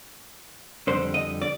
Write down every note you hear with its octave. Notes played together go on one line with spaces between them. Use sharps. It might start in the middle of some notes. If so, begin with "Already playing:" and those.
F2 D3 G3 C5
D#5
D5